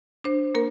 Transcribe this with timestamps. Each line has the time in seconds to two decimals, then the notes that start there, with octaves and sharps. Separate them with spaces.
0.24 D4 C5
0.55 A#3 A#4